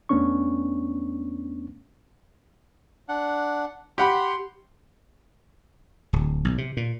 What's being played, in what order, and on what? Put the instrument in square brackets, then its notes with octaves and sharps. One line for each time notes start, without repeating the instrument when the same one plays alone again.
[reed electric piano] E2 A3 B3 C#4 D4 C#6
[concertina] D4 F#5
[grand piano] G4 F#5 B5 [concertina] C6
[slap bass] D1
B1
C3
A#2